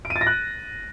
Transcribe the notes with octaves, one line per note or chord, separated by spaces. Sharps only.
D7
D#7
A6
A#6
F#6